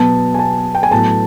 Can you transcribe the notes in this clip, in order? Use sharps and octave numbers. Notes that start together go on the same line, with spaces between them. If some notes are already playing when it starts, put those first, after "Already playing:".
Already playing: B2 F#3 B3 A5
G#5
A5
G5
G#5
A2 F#3 B3 A5